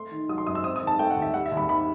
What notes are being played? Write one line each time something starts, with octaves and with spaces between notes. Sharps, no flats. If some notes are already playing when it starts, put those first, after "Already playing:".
Already playing: A3 C6
D#3
F#3 D#6
C6
F#2 D#6
E6
C4 D#6
D#6
D#3
A5
A3 G5
F#5
D#2
E5
G3 F#5
E5
D#2
B5
D#3 B5